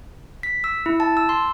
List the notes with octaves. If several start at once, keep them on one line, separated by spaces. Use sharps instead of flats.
B6
E6
E4
A5
E6
C6